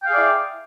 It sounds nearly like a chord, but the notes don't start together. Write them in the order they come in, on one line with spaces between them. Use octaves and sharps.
G5 F5 G#4 D5 E4